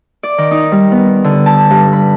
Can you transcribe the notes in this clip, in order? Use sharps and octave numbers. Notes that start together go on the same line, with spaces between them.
D5
D#3
D#4
G3
B3
D3
A5
G2
B5